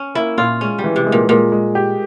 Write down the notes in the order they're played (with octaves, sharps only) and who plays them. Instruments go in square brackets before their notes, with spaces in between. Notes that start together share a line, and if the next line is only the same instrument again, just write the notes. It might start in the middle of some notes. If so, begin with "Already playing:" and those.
Already playing: [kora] C#4
[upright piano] A#3 [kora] E4
[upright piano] A#2 [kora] F4
[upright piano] G#3 [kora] C#4
[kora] G3
[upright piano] E3
[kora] C3
[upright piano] G#3
[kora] A#2
[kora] A#2 [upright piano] G#3
[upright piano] G#3
G4